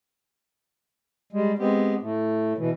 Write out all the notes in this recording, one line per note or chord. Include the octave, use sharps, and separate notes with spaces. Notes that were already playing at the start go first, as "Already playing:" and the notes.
G3 G#3
G#3 B3 C4 G4
A2 A3
B2 E3